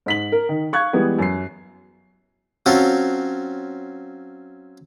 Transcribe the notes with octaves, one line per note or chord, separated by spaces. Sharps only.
G#2 B6 F#7
A#4
D#3
F5 C#6 F#6 G#6
E3 G3 G#3 B3 B4
F#2 C7
F#3 C4 C#4 F4 A4